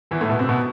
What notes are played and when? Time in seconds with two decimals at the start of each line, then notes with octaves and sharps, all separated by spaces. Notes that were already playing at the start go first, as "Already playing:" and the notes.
0.11 E2 E3
0.21 A2 A3
0.30 B2 B3
0.39 C3 C4
0.49 B2 B3